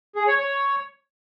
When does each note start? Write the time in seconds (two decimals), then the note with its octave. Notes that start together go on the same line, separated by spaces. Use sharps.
0.16 G#4
0.27 C#5
0.39 C#5